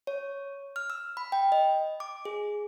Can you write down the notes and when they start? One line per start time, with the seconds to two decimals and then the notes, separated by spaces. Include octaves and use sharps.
0.07 C#5
0.76 F6
0.90 E6
1.17 B5
1.32 G5
1.52 D#5
2.00 D6
2.25 G#4